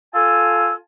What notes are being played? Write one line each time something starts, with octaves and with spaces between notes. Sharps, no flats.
F4 A4 G#5 A5 E6